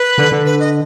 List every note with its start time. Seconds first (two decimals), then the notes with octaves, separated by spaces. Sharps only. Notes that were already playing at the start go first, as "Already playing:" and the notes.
Already playing: B4
0.18 D3
0.32 D3
0.46 B4
0.60 D#5